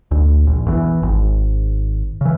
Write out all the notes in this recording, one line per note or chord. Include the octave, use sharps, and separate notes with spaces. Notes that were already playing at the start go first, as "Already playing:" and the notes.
D2
A#1
E2 E3
G#1
C#3 E3